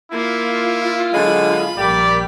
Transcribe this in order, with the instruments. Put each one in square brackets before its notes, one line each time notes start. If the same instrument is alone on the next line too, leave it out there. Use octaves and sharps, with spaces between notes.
[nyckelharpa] A#3 [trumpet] E4 [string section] F4
[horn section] D3 F#3 G#3 [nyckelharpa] B5
[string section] A#1 A#3 B6 [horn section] G3 G4 [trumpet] D5